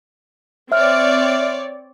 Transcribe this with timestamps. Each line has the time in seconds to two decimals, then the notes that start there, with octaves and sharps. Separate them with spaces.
0.72 C4 C#5 D5 E5 F6